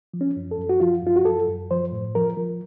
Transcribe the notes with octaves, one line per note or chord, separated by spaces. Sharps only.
F3
C#4
F#2
A4
F#2
F#4
F3 F4
F#2 F4
F#4
F#2 A4
F#2
F3 C5
A2
F3 A#4
F3